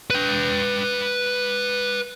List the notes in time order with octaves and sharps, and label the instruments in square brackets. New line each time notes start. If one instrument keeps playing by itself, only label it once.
[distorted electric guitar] B4 G5